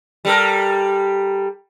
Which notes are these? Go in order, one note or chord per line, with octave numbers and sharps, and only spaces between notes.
G3 A4 A#4